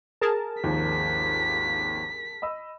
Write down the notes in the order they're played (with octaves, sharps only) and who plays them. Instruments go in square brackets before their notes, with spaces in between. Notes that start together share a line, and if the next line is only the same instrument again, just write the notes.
[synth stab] G#4 A#4 A5
[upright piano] G#1 D#2 F3 [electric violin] B6
[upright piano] D#5 B5 E6